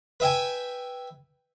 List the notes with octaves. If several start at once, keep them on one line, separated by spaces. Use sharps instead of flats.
B4 E5 G5 G#5